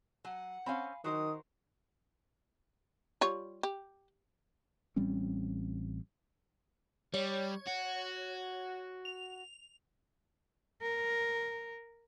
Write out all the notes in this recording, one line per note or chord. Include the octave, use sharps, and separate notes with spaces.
F#3 F#5 G#5
C4 C#4 F5 G#5 B5
D#3 F#3 F#4 A#4 C5 D#6
G3 F4 C#5
G4
A1 G3 C4 C#4
G3 C#5
F#4
F7
A#4